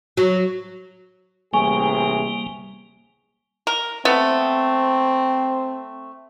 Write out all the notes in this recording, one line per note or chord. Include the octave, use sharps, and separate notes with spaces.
F#3
A1 C3 G3 A#3 G#4 G#5 C#6
A#4
A3 B3 C4